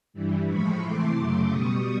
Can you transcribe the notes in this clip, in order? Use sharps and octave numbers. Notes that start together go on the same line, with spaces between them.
G2 E3 G3
A2 F3 G#3 B5 C#6
C3 E3 A3 C6 D6
F#2 C#3 F#3 A3 C6 D6
B2 G3 C#6 D#6